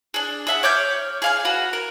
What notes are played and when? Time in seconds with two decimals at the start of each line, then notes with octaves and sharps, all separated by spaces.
0.14 D4 G#4
0.47 G#4 E5 F#5
0.63 C#5 D6 F6 G6
1.22 G#4 F5 G#5
1.45 F#4 B4
1.73 A#4